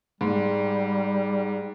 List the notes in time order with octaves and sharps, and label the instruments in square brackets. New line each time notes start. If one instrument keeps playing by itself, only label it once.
[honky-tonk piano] G#2 [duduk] G3